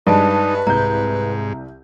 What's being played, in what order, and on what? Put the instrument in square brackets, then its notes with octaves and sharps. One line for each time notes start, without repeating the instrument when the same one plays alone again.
[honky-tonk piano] G2 G#3 [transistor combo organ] D#4 [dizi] B4 [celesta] D5 A5
[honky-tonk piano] C2 G6 [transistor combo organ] G#2 [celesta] A#5